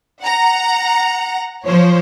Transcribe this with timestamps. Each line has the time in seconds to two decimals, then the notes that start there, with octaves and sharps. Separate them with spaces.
0.20 F#5 A#5
1.65 F3 C5 C#5